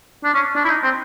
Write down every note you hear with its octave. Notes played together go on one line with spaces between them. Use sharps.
D4
C#4
D4
E4
D#4
C4